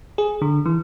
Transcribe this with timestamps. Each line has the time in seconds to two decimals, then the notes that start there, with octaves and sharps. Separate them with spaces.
0.18 G#4
0.42 D3
0.66 E3